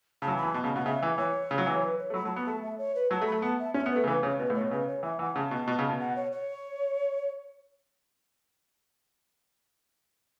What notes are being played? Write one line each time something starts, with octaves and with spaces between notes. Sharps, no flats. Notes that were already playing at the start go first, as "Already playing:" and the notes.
C#3 A5
F#3
E3
B5
E3
B2 A5
C#3 A5
B2 F#5
C#3 E5
E3
E3 C#5
C#3
F#3
E3
B4
C#5
A3
F#3 B5
F#3 A5
B3 B5
A3 A5
E5
C#5
B4
F#3 A5
A3
B5
A3
B3 A5
E5
C#4 E5
B3
A3 B4
C#3
E3 B4
C#3 C#5
B2 B4
A2
C#5
B2
C#3 B4
C#5
E3 E5
E3 F#5
C#3 A5
B2
B2
C#3
B2
F#5
C#5
C#5